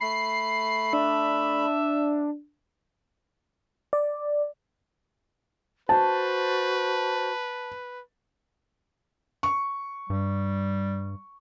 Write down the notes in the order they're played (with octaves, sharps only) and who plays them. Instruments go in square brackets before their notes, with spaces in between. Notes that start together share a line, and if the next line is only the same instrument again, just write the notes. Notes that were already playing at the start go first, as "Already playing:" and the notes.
[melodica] A3 B5 [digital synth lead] C7
[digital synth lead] D4 [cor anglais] E5
[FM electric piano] D5
[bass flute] F#4 [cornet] B4 [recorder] C5 [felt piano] A5
[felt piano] C#6
[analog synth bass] G2 [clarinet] G3